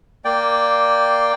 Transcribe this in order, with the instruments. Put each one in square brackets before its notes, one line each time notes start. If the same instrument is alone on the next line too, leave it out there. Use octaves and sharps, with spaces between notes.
[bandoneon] A#3 D5 G5